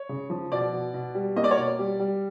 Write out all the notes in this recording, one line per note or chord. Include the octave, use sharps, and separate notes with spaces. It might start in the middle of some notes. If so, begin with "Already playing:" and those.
Already playing: C#5
C#3
F3
B2 D5
B2
B2
G3
A#3 D#5
D5
C#5
B2 D5
G3
G3